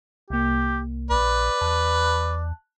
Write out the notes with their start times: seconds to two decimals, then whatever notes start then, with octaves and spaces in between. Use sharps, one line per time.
0.30 C2 A#3 G4
1.11 A#1 B4 D5
1.61 E2 A5 F#6